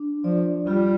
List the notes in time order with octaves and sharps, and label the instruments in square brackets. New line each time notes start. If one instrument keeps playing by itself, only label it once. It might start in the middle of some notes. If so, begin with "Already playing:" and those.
Already playing: [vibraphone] D4
[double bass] F3 [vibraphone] D5
[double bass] G3 [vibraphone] F4